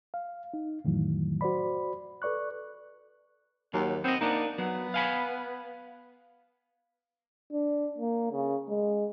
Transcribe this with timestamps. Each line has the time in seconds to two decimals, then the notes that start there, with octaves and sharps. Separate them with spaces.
0.14 F5
0.54 D#4
0.85 F2 A2 D#3 E3 F#3
1.41 F#4 C5 D5 B5
2.22 A4 B4 D5 C#6 F#6
3.74 D#2 F#3
4.04 B3 C4 D#5
4.21 A#3 B3 D4 D#4
4.58 F#3 B3
4.94 F5 G#5 B5
7.52 D4
7.98 A#3
8.32 C#3
8.69 G#3